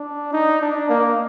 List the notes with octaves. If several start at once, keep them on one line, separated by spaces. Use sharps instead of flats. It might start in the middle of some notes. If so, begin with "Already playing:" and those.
Already playing: D4
D#4
D4
A#3